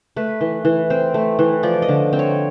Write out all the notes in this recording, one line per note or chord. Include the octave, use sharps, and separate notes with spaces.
A3 B4
E3
E3
C4 C5
A3
E3
F3 D5
D#5
D3
C4
C#5